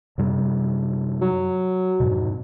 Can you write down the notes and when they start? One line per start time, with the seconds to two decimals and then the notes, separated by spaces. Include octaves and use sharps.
0.18 F#2 C3 G3
1.21 F#3
2.00 F2 G#2 B2